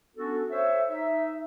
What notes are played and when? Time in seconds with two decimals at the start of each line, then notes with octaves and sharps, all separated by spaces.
0.16 B3 C#4 D4 F#4 A4
0.51 C5 C#5 E5
0.89 D#4 E5